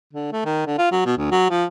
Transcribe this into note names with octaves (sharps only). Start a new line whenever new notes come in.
D3
A3
D#3
D3
F4
F#3
B2
D2
F#3
F3